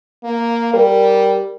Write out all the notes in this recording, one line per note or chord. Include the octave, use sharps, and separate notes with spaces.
A#3
G3 A#4